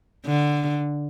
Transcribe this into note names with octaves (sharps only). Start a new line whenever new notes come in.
D3